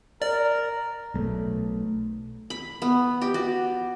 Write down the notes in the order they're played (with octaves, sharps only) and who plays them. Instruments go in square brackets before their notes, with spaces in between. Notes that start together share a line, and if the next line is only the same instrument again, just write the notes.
[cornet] A#4 [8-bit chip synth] D5
[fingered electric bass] B1 A3
[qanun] B5
B3
G4
F#4